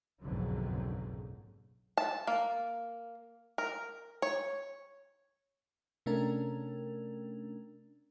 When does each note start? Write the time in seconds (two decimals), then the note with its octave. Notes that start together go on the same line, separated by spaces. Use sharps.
0.22 F#1 B1 F2 G#2 D3 F#3
1.97 A5
2.27 A#3
3.58 A#4
4.22 C#5
6.06 C3 A3 C#4 D4 A#4